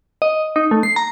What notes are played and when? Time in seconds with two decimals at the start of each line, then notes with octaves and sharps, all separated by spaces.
0.22 D#5
0.56 D#4
0.71 A3
0.83 C7
0.96 A#5